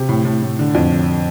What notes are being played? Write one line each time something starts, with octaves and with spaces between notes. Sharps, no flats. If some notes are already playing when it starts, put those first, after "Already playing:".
Already playing: C3
A2
A2
A2
D3
F2
D3